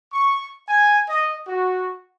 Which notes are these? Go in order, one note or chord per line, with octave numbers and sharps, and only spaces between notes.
C#6
G#5
D#5
F#4